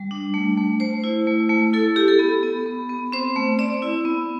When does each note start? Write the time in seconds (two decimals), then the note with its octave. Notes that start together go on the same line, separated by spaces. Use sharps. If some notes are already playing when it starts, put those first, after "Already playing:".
Already playing: G3
0.11 D4
0.34 A3
0.57 A3
0.80 A3 C5
1.04 E4
1.27 A3
1.49 A3
1.73 E4 A4
1.96 E4 G4
2.08 A4
2.19 B3
2.43 B3
2.66 B3
2.89 B3
3.12 C4 C5
3.36 A3
3.59 C4 D5
3.82 E4
4.05 B3